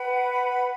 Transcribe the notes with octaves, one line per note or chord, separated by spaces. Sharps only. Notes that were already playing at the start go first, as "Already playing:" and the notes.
Already playing: B4 F#5 B5